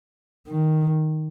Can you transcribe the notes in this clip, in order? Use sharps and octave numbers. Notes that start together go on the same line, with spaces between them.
D#3